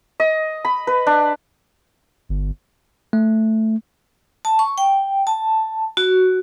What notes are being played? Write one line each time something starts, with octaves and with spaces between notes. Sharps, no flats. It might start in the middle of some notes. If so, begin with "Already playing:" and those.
D#5
B5
B4
D4
G1
A3
A5
C#6
G5
A5
F#4